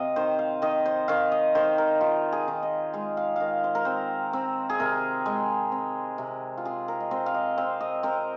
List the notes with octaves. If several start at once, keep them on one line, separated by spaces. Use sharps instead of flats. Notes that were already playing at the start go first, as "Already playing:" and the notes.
Already playing: C3 C4 D#5 F5
D#3 C5
F5
D#3 D#5
C5
D#3 F5
D#5
D#3 C5
A#4
D#3 F4
G#4
D#3
D#5
G#3 F5
F5
D#3 D#5 F5
C5
A#4
C4 C5
C4
G#4
C3 A#4
G#3
C4
C3
F4
C4 G#4
A#4
D#5
C4 C5
F5
D#5
C4 F5
D#5
C4 A#4